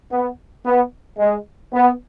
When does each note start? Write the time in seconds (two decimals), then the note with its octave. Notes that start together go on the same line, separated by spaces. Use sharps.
0.11 B3
0.65 B3
1.19 G#3
1.73 B3